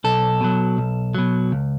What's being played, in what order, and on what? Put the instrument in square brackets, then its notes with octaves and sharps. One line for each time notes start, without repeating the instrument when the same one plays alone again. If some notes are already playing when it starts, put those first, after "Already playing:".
[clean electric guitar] B1 A4
B2 F#3
B1
B2 F#3
C#2